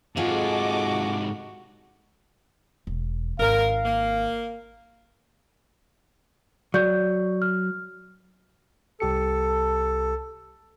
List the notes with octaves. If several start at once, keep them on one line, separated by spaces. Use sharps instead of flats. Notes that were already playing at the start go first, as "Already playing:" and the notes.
G#2 C3 F4 F#4 G#4 A4 D#5 D6
E1
G#1 A#4 F5
A#3
F#3 D5 G6
F6
C2 G4 A4 C#7